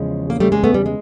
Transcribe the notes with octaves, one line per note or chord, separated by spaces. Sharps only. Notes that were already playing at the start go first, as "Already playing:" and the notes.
Already playing: E2 C#3 F3 G#3
A#3
G3 A3
G#3 A#3
A3 B3
G3
G#3